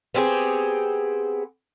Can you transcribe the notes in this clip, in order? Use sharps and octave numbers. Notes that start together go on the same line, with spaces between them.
B3 C4 G4 G#4